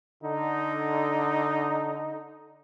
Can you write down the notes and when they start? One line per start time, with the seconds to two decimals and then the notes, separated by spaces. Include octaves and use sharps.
0.23 D3 D#4